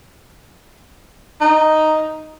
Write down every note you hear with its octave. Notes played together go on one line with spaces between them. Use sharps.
D#4